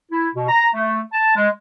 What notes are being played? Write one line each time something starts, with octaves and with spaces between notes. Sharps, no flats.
E4
B2
A#5
A3
A5
G#3